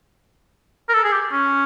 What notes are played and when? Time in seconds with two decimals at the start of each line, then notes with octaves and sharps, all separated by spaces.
0.89 A#4
0.93 A4
1.04 G#4
1.12 G4
1.32 C#4